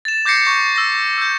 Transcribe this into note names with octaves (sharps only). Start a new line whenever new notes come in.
A6 E7
D6 G6 A#6 C7 C#7
C#6
E6 A#6
E6 G6